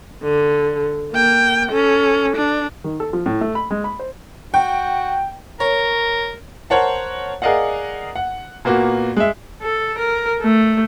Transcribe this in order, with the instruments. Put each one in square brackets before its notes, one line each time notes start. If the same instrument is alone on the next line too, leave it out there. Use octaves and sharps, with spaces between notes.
[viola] D3
A#3 G5
C#4 A4
D4
[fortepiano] D#3
A4
F3
A2
A3
B5
G#3
B5
C5
[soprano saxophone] F#4 [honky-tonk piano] G5
[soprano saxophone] A#4 [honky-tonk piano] C#5
[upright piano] A#4 C5 C#5 F#5 A5
G#4 A#4 D5 D#5 F5 F#5
F#5
A#2 A#3 B3 F#4
G#3 E5
[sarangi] A4
A#4
A3